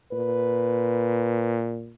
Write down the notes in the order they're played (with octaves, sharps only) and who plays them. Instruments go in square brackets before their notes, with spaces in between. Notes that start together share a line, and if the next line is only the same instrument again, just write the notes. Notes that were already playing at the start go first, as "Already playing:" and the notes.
[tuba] A#2 [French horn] B4